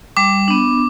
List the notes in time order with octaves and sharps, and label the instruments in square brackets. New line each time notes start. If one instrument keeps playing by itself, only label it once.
[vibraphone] G3 [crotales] D6
[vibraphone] B3 D4